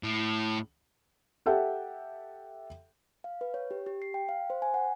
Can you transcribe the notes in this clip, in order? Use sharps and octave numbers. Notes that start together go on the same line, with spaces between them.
A2
G4 A4 E5 F#5 G5
F5
B4
C#5
G4
G4
C7
G5
F5
C5
G#5
F#5